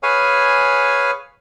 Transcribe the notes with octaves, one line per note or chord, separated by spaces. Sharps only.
G#4 B4 C#5 F5 G#5